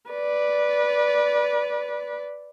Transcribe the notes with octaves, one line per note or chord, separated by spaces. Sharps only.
B4 D5